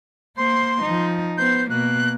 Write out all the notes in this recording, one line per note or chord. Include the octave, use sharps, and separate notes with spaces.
A#3 C5 C6
F3 D#4
B3 C5 G6
B2 A#3 F#6